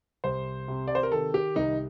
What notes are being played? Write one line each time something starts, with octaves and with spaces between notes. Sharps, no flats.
C2 C5
C3
D5
C5
A#4
D#3 A4
G4
C2 D#4